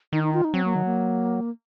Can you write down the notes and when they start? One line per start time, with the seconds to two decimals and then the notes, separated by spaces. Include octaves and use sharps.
0.13 D#3 D#4
0.23 D#4
0.34 F4
0.44 D#4
0.54 F#3 C4
0.65 A#3
0.75 D#3
0.85 A#3